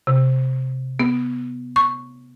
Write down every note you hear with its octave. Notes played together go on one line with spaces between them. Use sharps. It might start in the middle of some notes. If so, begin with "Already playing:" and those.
C3
B3
C#6